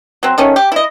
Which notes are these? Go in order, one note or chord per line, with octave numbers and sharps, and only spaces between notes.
F#3 C4
D#3 A3 C#4
G4
E4 D#5